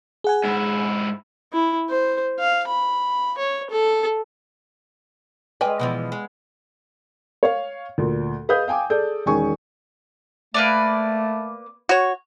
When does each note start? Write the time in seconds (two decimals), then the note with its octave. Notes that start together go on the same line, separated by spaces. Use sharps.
0.24 G#4 F#5 G#5
0.44 G#2 E4
1.53 E4
1.89 C5
2.39 F5
2.68 B5
3.38 C#5
3.70 A4
5.61 G#3 B4 D5 D#5 F5 G5 G#5
5.79 B2 E3 F3 B3
6.12 G#3
7.43 C#5 F5
7.98 D2 A#2
8.49 G#4 B4 D#5 F5 D#6 G6
8.68 F5 G5 G#5 D6
8.90 G#4 A4 D5 G6
9.26 E1 D#3 C#4 G#4 G#5 C#6
10.54 A3 A#3 B4 D5
11.89 F#4 C#5